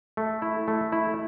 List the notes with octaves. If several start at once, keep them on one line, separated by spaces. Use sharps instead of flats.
A3
E4
A3
E4